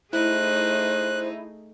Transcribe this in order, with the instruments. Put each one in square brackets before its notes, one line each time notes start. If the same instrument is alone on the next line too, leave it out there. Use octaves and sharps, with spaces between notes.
[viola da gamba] A3 D#4 G#4 [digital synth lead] E4 [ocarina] C5 [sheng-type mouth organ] F#6